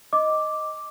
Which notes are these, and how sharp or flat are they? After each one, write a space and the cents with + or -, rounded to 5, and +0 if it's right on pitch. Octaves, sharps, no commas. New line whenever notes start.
D#5 +0 D6 +0